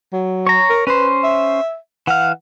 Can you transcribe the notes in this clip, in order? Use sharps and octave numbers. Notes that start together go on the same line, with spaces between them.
F#3
C#5 A#5
A#4
C#4 B4 C5
E5
E3 F5 F#5